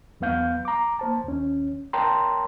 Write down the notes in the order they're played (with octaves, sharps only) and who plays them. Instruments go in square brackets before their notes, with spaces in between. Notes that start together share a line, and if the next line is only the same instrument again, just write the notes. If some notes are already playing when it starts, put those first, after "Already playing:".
[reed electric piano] E2 F#3 B3 F5 G6
A#5 D6
A#3 C5 A5
D#2 C#4
A#4 C#5 G5 A5 A#5 C6